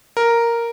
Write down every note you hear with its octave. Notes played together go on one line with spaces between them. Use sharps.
A#4